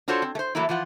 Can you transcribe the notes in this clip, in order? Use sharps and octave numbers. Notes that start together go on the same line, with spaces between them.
D4 F4 F#4 A4 C5 C#5
C4
A3 C5
E3 F#3 A3 A#3 E4
E3 F3 F4 F#5